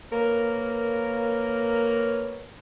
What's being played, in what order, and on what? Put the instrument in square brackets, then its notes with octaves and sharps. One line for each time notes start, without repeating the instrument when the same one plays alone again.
[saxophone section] A#3 A#4 B4 C#5